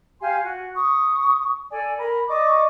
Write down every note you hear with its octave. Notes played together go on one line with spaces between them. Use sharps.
G4 F5 G#5 C6
F#4
C#6 D#6
A4 D5 G#5
A#4 B5
D5 D#5 C#6 D6